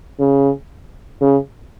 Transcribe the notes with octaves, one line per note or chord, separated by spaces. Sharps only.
C#3
C#3